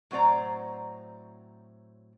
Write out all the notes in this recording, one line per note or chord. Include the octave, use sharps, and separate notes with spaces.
A2 F#3 C4 C5 D5 A#5